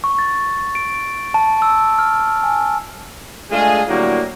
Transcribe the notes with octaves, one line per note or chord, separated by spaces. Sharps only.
C#6
A6
D7
A5
E6
F6
G#5
G#3 A3 D4 F4 G#4
A2 D3 F#3 G3 A#3